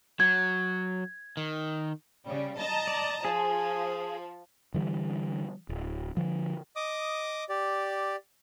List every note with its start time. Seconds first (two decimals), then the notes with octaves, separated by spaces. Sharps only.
0.20 F#3 G#6
1.37 D#3
2.25 C#3 G3
2.57 D#5 A5 A#5
2.87 D5
3.25 F3 G#4
4.74 D3 E3 G3
5.69 D1
6.17 D3 F3
6.76 D#5 D6 D#6
7.49 G4 D5